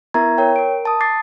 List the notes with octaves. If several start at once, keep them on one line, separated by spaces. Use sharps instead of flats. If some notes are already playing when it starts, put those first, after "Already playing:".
B3 E4 A#4 E5 A#5 G#6
A#4 C#5 G5
A#4 D7
A5 D#6
D6 D#6 A6 C7